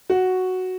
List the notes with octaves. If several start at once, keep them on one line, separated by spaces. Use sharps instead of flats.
F#4